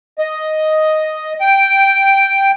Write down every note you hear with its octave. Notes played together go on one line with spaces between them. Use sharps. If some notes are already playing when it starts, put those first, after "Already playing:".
D#5
G5